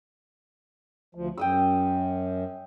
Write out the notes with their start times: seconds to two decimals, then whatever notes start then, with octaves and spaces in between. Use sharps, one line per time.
1.15 D2 F3
1.38 F#2 G5 D#6 E6